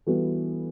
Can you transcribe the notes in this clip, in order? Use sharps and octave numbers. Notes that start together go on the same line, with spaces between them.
E3 G3 B3 F#4 A4